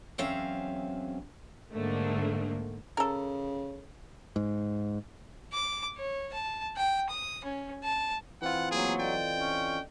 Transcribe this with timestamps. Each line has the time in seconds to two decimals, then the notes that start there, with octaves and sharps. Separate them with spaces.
0.18 E2 F#3 C4 C#4 E5 F5
1.73 G#2 D3 A3 A#3
2.97 C#3 A4 A#4
4.36 G#2
5.53 D6
5.97 C#5
6.33 A5
6.77 G5
7.09 D#6
7.44 C#4
7.83 A5
8.42 E3 C4 F4 F#5 B5
8.71 F#3 A#3 B3 G#4
9.00 A4 D5 D#5 G5
9.36 C#4